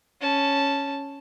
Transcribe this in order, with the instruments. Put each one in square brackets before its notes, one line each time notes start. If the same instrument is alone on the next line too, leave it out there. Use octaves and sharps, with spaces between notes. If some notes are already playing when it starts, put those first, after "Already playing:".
[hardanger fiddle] C#4 A5